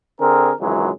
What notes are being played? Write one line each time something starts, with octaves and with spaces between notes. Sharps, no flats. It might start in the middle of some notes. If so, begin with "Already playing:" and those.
D3 C4 G#4 A#4
G#1 C#2 F#2 E3 F#3 G#3